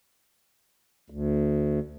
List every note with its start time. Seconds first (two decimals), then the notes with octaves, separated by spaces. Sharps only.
1.10 D2